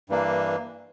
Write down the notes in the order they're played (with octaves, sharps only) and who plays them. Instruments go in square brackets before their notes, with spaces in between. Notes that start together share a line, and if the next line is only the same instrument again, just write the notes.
[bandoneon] G2 E3 A#3 D4